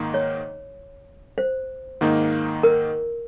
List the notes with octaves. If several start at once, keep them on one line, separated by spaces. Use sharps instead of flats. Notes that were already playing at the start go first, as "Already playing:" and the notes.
Already playing: G#2 D#3 A#3 D#4
C#5
C5
G#2 D#3 A#3 D#4
A#4